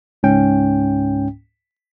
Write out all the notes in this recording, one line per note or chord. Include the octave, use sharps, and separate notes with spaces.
C#2 G#2 C#4 G5